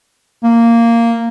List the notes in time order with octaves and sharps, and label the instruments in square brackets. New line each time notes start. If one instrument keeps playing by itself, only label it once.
[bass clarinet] A#3